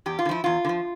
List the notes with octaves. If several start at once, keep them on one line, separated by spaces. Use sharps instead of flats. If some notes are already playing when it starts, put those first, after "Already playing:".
E2 G4
F4
D3
F3 E4
E2 F4
D3
F3